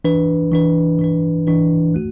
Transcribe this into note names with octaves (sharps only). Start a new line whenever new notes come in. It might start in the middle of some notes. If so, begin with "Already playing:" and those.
E3 D4 B4
E3 D4 B4
E3 D4 B4
E3 D4 B4
A3 F#4